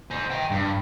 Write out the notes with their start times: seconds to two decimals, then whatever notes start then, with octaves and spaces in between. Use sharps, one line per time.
0.11 C5 G#5
0.31 G5 A#5
0.51 G2